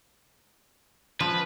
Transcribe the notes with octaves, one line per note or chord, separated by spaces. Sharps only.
F3 B4